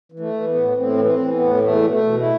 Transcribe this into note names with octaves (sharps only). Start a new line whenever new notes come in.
E3
A3
E3
B3
A2
A2 C4
E3
C4
E3
B3
A2
E2 A3
B2
A3
B2
E4